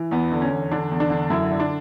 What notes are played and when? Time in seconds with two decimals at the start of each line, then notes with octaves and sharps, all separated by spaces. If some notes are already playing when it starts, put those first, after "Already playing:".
Already playing: E3
0.11 E2 B3
0.32 D3
0.42 C#4
0.51 E2
0.71 D3 D4
0.92 E2
1.00 D4
1.10 D3
1.30 F#2 E4
1.51 D3
1.60 D4